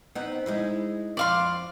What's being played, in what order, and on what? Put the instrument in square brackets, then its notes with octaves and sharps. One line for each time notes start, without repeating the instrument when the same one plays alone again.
[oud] B3 C4 D#4
G#3 D#4 E4
[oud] F2 [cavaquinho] D5 F5 C6